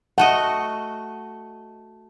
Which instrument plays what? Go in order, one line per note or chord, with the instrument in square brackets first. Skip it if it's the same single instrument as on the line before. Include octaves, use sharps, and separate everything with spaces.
[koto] A3 F#4 D#5 [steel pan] F#5